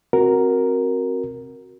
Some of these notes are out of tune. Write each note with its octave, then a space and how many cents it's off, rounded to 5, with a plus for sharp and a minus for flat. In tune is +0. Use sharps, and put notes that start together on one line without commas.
C4 +15 F#4 +0 A#4 +0